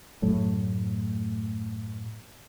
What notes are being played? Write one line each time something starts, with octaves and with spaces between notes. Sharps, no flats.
F#2 A2 F#3 A3